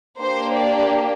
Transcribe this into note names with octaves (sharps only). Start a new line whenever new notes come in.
A#3 D4 G4 C5
D5